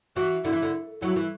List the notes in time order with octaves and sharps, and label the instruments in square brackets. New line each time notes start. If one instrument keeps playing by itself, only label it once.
[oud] E3 [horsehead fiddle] F#4
[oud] D3 [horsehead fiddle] E4
[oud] E3
D3
[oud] F#3 [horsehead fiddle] E4
[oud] E3